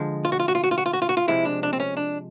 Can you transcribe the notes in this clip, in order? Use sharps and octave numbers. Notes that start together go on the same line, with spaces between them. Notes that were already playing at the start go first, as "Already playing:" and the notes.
Already playing: D3 F3 G#3
F4
F#4
F4
F#4
F4
F#4
F4
F#4
F4
F#4
F4
F#4
F4
C3 F3 G#3 E4
D4
D4
C4
C#4
D4